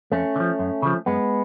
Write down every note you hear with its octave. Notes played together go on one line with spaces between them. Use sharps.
F2 A3 C#4
D3
F3
F#2
C#3 F3
F#2 G#3 B3